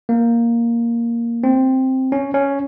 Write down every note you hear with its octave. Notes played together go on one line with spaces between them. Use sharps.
A#3
C4
C#4
C#4